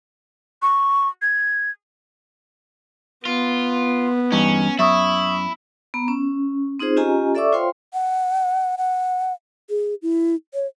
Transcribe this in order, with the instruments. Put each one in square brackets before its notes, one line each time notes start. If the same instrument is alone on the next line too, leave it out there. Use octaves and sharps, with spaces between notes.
[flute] C#6
G#6
[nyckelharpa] B3 [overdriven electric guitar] F4
[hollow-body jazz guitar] E2 G2 D#4 [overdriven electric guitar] C#4
[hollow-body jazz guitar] F#2 [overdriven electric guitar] E4 [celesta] E5 C#6 D#6
[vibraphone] B3 A#5
C#4
C4 D#4 F4 G#4 C5
C#4 F4 G4 D#5 G#5 A#5
A4 D5 E5 C#6 D6 E6
F4 C5 C#5 F5 G5 C6
[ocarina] F#5
F#5
G#4
E4
C#5